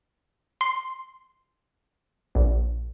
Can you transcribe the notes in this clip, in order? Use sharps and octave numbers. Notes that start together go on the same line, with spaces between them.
C6
A#1